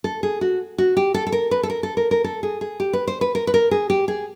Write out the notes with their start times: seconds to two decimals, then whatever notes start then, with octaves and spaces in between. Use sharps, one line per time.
0.04 A4
0.23 G#4
0.41 F#4
0.78 F#4
0.97 G4
1.14 A4
1.27 A4
1.32 A#4
1.51 B4
1.63 A4
1.70 A#4
1.83 A4
1.97 A#4
2.11 A#4
2.24 A4
2.43 G#4
2.61 G#4
2.80 G4
2.93 B4
3.07 C5
3.21 B4
3.35 A#4
3.47 B4
3.54 A#4
3.71 G#4
3.90 G4
4.08 G#4